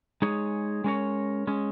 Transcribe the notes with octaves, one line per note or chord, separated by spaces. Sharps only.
G#3 D#4 G#4 C#5
G#3 C#4 A#4 C#5
G#3 C#4